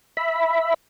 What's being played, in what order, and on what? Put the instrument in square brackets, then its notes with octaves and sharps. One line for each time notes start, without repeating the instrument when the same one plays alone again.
[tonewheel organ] E5 B5